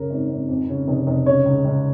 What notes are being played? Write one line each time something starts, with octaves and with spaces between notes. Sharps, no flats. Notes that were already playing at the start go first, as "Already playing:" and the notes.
Already playing: F#2 C#3 A#4
G#1
G#1
F2
C#3
F1
F1
C#3 C#5
C#2
C#2